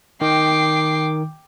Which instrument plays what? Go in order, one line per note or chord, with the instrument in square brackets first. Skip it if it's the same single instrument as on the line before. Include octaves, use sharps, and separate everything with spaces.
[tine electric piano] D#3 [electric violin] G5 C7 [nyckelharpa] D6